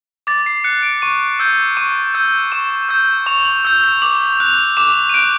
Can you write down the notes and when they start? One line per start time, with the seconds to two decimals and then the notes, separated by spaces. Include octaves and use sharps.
0.27 D6 A6
0.46 C7
0.64 F#6 C#7
0.83 D7
1.02 C#6 D#7
1.39 E6 G6
1.77 C#6 D#7
2.14 E6 G6
2.52 C#6 E7
2.89 E6 G6
3.26 C#6 F7
3.45 F#7
3.65 E6 G6
3.84 F7
4.02 D6 F#7
4.40 F#6 F7
4.77 D6 E7
5.10 D#7
5.14 F#6 D7